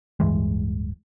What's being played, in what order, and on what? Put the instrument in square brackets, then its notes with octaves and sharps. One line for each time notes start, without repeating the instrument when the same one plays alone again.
[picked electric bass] D1 G2 E3 G#3